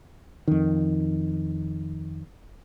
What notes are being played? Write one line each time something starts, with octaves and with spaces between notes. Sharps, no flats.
F2 D#3